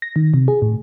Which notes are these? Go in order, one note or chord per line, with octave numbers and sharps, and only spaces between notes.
A#6
D#3
C3
G#4
A2